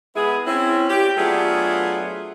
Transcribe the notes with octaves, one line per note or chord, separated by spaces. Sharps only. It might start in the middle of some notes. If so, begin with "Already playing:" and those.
G#3 B3 E4 G#4
C4 C#4 E4
G4
F#3 A3 B3 D4 F4 G#4